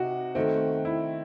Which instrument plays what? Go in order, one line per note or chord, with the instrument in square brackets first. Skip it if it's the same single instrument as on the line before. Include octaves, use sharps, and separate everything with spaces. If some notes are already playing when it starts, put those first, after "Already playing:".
Already playing: [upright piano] C3 D#4 [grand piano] F#4
[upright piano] D#3 A3 C4
[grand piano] E4